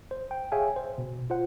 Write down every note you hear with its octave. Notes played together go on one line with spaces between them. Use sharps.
C5
G5
G#4 C#5 E5 F5 G5 G#5
C5
B2
F4 C5 F#5